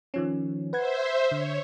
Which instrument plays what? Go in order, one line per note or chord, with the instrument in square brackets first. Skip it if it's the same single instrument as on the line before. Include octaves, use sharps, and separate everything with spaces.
[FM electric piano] D#3 F3 C#4
[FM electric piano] B4 F#5 G#6 [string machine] C5 E5
[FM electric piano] D3 [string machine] C#5